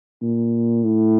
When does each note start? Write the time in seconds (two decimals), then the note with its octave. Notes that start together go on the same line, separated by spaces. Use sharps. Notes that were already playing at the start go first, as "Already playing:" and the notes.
0.22 A#2
0.84 A2